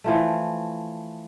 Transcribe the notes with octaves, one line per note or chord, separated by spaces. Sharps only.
E3 F3 A3